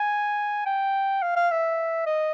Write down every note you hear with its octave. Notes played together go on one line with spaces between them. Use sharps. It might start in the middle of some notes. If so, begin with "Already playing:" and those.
Already playing: G#5
G5
F5
F5
E5
D#5